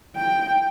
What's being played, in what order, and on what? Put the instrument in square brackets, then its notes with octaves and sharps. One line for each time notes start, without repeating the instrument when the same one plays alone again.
[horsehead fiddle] G5